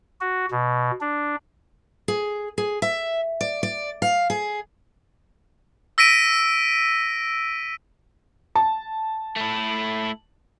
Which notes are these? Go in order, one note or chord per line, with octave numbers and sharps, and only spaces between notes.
F#4
B2
D4
G#4
G#4
E5
D5
D5
F5
G#4
E6 A#6 B6 D7 D#7
A5
A3 E4